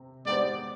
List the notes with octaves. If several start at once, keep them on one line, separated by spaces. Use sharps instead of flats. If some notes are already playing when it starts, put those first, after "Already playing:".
Already playing: C3 C4
G#3 B3 D#4 G4 C5 D5